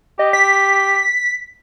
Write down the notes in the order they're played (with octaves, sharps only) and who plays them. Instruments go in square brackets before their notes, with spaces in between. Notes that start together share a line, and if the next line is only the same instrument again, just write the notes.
[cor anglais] G4 [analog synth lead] D#5
[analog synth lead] B6